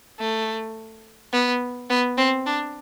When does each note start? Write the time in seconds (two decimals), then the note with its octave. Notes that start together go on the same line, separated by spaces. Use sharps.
0.19 A3
1.33 B3
1.90 B3
2.18 C4
2.46 D4